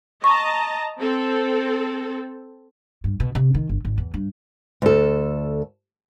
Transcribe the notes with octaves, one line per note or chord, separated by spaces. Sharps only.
D#5 A5 A#5 C#6
C4 A4
G2
B2
C3
D#3
G1
G#1
E2
G2
D2 A4